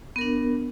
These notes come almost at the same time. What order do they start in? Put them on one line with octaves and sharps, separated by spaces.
B3 A#4 D4